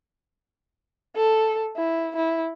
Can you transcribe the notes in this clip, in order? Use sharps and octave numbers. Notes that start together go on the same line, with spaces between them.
A4
E4
E4